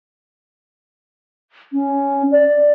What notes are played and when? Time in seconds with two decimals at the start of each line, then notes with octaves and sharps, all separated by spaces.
1.73 C#4
2.31 D5